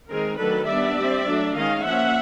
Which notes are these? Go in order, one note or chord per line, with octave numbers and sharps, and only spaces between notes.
D#3 G#3 C4 G#4 A#4
D#3 F#3 A3 D4 A4 B4
G3 B3 D4 D5 E5
G3 C4
F#3 A3 D4
D#3 G#3 C#4 D#5 F5
F3 A#3 C#4 E5 F#5